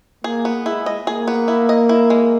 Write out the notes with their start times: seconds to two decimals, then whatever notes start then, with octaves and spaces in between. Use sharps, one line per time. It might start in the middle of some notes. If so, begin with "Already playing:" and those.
0.24 A#3 G#4
0.45 B3
0.65 G#3 E4
0.86 D#5
1.07 A#3 G#4
1.28 B3
1.48 E4
1.69 D#5
1.89 E4
2.10 G#3